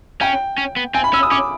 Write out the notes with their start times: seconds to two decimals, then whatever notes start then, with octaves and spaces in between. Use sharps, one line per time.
0.21 C#4 G5
0.58 C#4
0.76 B3
0.94 C4 G#5
1.04 B5
1.13 C#4 E6
1.23 D#6
1.31 C#4 D6